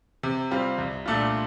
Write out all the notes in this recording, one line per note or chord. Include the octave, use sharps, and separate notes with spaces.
C3
G3 C4 F4
C2
A#2 A3 D4 F4